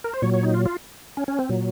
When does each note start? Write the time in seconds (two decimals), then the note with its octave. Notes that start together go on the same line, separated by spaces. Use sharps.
0.04 A#4
0.13 C5
0.22 A#2 F#3 C#5
0.34 C#5
0.43 D#4
0.54 F4
0.66 F4
1.17 C#4
1.28 C#4
1.39 C4
1.49 A#2 F#3